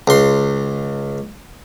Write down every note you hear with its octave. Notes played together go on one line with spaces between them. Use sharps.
C#2 C6